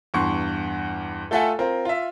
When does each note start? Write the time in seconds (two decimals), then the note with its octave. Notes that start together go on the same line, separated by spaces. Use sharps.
0.14 E2 G2 C6 C#6
1.31 A3 F4 A4 E5 F#5 G#5
1.59 C4 F4 A#4
1.85 F4 E5